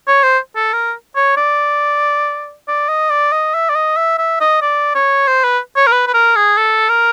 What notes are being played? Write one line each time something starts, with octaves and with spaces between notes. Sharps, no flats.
C#5
C5
A4
A#4
C#5
D5
D5
D#5
D5
D#5
E5
D5
D#5
E5
E5
D#5
D5
C#5
C5
B4
C#5
A#4
B4
B4
A#4
G#4
A4
A#4